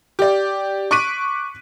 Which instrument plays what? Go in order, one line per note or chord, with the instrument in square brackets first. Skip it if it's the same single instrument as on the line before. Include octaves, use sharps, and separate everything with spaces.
[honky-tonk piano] G4 D5
C#6 D6 F#6 B6 D7 D#7